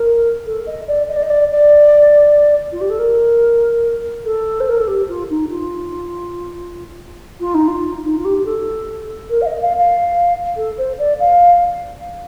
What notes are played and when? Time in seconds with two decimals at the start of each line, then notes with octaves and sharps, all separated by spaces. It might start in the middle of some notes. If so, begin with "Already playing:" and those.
Already playing: A#4
0.46 A4
0.67 D#5
0.88 D5
1.08 D#5
1.16 D5
1.23 D#5
1.30 D5
1.51 D5
2.72 F4
2.81 G4
2.90 A4
2.99 A#4
4.25 A4
4.60 C5
4.69 A#4
4.79 A4
4.87 G4
5.08 F4
5.30 D#4
5.51 F4
7.40 F4
7.54 D#4
7.68 F4
8.04 D#4
8.19 F4
8.25 G4
8.38 G4
8.45 A4
9.30 A#4
9.42 F5
9.46 D#5
9.62 F5
9.78 F5
10.56 A4
10.78 C5
10.99 D5
11.20 F5